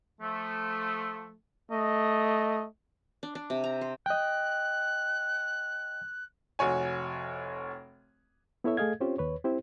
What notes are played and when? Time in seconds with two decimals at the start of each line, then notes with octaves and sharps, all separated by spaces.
0.21 F3 A3
1.71 A3 D#5
3.23 D4
3.35 D4
3.50 C3
3.64 A#5
3.81 C5
4.06 D#5 G5 F#6
6.59 F1 F#4 C#5 G#5
8.64 B3 E4 A4 C#5 E5
8.77 A3 G#4 A4 D#5 F5 G#6
9.00 C4 C#4 F4 G4 C5 C#5
9.18 D#2 B4 C#5
9.44 C4 E4 G4 C5